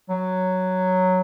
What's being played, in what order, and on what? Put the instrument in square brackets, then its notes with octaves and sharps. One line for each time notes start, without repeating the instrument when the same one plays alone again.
[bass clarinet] F#3